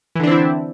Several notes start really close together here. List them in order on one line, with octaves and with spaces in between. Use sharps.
E3 D3 D4 C4 E4